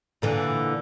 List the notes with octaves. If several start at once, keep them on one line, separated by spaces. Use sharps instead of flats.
A#2 D3 E3